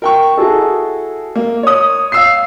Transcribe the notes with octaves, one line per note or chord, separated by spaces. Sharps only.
A#4 G5 C#6
E4 F#4 G#4 A4
A#3
C#5 D#6
F5 E6 C7